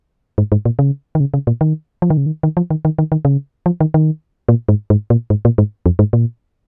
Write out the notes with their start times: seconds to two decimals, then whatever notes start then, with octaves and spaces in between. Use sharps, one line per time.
0.38 G#2
0.52 G#2
0.65 A#2
0.79 C#3
1.15 D#3
1.20 C#3
1.34 C#3
1.47 A#2
1.61 D#3
2.02 F3
2.10 D#3
2.17 C#3
2.26 D#3
2.43 D#3
2.57 F3
2.70 D#3
2.85 D#3
2.98 D#3
3.12 D#3
3.25 C#3
3.66 F3
3.80 D#3
3.94 D#3
4.49 A#2
4.69 G#2
4.90 G#2
5.10 A#2
5.30 G#2
5.45 A#2
5.58 G#2
5.86 F2
5.99 G#2
6.13 A#2